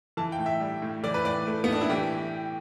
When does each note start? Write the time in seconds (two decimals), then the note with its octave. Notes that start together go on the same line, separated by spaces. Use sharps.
0.17 E3 A5
0.32 G5
0.39 A2
0.46 E5
0.60 G3
0.82 A2
1.04 E3 D5
1.14 B4
1.25 A2 D5
1.47 A3
1.64 B3
1.68 A2 D4
1.81 E4
1.90 E3 G4